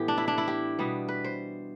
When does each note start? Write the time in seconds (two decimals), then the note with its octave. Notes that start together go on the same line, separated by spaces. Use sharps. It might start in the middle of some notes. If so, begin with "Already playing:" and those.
Already playing: A2 E3 B3 G4
0.08 D4
0.18 E4
0.28 D4
0.38 E4
0.48 G4
0.79 B2 G3 B3
1.08 B4
1.24 C5